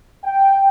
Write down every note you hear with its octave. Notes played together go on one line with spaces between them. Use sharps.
G5